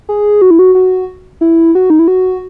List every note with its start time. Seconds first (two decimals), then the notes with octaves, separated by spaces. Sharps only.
0.09 G#4
0.42 F#4
0.50 E4
0.59 F#4
0.75 F#4
1.41 E4
1.75 F#4
1.90 D#4
1.99 E4
2.08 F#4